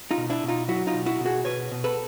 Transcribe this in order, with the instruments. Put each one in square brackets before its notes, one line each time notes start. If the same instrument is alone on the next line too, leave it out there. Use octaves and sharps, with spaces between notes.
[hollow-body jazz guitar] D#4 F4
B2
D4 E4
B2
D#4 F4
F#3 E4 F#4
D#4 F4
B2
E4 F#4
B2
F#4 G#4
B2 B4 C#5
B2
A4 B4